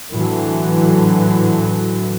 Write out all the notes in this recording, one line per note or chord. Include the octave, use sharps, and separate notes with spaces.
A2 D3 E3 F#3